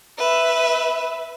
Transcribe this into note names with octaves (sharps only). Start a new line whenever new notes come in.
B4 E5